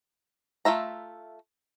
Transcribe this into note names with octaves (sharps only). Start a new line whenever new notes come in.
A3 F4 E5 A#5